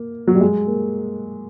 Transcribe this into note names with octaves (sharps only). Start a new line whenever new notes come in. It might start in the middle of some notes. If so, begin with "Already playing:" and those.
Already playing: A#3
F#3
G3
G#3
A#3